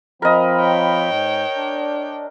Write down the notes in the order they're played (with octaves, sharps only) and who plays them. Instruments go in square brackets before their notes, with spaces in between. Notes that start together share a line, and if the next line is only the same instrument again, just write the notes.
[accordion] F3 C4 B5 [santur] A#4 D#5
[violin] C#5 G5
[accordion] G#2
D4